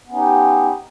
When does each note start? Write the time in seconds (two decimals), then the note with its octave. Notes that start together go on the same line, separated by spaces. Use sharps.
0.07 B3
0.10 C#4
0.14 D#4
0.17 G4